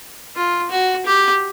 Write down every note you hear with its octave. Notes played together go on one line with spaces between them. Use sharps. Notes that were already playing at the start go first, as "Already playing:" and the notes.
F4
F#4
G4